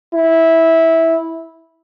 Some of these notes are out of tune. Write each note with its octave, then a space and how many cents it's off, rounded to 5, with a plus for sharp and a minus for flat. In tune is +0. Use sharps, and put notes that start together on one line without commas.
E4 -15